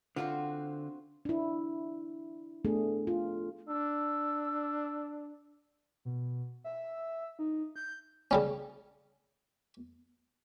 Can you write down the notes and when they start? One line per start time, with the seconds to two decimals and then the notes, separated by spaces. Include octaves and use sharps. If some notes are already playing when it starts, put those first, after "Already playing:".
0.16 D3 C4 F4 F#4 C5
1.25 D4 E4
2.65 A3 B3 D4 G#4
3.07 F4
3.68 D4 E6
6.05 B2
6.64 E5
7.39 D#4
7.76 G6
8.31 C#3 G3 C#4